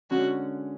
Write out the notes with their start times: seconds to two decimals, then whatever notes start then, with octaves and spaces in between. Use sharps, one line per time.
0.10 D3 G#3 C#4 F#4